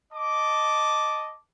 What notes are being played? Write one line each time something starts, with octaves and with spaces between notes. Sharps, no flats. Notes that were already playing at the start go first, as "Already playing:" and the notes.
D#5 A5 D6